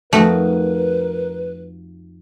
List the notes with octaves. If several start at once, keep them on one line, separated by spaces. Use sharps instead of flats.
F2 D#3 A3 F#4 A#4 B4